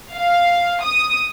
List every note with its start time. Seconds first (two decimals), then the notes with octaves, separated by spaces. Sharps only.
0.12 F5
0.83 D#6